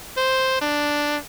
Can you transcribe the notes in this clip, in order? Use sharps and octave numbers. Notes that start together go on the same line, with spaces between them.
C5
D4